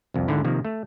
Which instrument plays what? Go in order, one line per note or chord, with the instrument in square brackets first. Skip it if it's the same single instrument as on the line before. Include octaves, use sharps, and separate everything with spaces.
[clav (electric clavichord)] C2 F2
D#2 G#2 D3 E4
C3 D#3 F3 A#3
A3